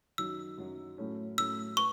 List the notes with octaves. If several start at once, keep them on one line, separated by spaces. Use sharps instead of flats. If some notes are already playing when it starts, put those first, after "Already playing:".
F#2 D#3 F#3 E6
F#2 D#3 F#3
A2 F#3 A3 C#4
A2 F#3 A3 C#4 E6
B4 C#6